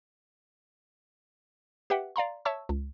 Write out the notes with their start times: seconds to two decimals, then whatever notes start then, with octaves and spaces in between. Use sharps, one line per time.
1.90 G4 B4 E5 F#5 G5
2.16 D5 F5 A#5 C6
2.45 C#5 E5 A5 C#6 E6
2.69 C#2